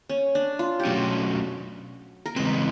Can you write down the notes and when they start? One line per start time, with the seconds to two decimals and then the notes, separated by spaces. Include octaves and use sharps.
0.09 C#4
0.35 D4
0.59 F4
0.80 G4
0.85 B2 F#3 A3 C#4 F#4
2.26 A#4
2.36 C#3 E3 G#3 C4 B4